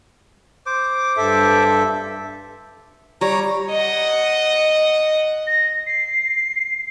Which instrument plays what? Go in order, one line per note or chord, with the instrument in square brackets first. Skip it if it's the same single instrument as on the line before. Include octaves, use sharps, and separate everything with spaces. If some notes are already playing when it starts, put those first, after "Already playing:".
[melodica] C5 D6
[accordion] G2 A4 E5
[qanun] G3 [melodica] C#5 A#5
[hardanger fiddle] D#5 F#5
[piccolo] A#6
C7